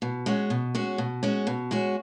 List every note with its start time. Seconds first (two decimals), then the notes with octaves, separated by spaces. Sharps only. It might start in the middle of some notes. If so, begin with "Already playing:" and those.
0.02 B2
0.26 G#3 C#4 F#4
0.50 B2
0.75 G#3 C#4 F#4
0.98 B2
1.23 G#3 C#4 F#4
1.47 B2
1.71 G#3 C#4 F#4